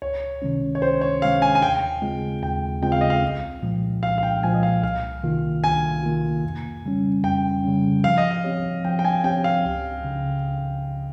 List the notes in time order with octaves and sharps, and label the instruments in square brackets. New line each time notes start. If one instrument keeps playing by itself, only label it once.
[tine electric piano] C#2 [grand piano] C#5
[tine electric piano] C3 D#3 G#3 C#4
[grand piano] C#5
[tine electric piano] C#2 [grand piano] C5
[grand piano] C#5
[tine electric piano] C3 D#3 G#3 C#4 [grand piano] F5
[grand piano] G#5
G#5
[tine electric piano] D#2 [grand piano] G5
[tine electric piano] C#3 G#3 C4 F4
[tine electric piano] D#2 [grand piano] G5
[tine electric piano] C#3 G#3 C4 F4 [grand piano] G5
[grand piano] F5
D#5
F5
[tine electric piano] C2
A#2 F3 G#3
[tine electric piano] C2 [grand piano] F5
[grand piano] F5
G5
[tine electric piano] A#2 F3 G#3 [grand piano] G#5
[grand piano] D#5
F5
[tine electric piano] C2 [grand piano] F5
[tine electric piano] C3 D#3 A#3 F4
[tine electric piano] C2 [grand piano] G#5
[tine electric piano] C3 D#3 A#3 F4
F2
C#3 G3 C#4
[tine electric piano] F2 [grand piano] G5
[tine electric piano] C#3 G3 C#4
[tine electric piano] F3 [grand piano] F5
[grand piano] D#5
F5
[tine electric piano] C4 G4 C#5
[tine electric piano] F3 [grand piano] G5
[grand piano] G5
G#5
[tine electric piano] C4 G4 C#5 [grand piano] G5
[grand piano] F5
[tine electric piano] C#2
C#3